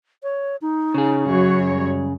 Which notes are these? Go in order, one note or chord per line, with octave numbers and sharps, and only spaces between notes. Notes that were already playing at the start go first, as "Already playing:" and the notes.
C#5
D#4
C#3 G#4
F#2 F#4 C#5
G3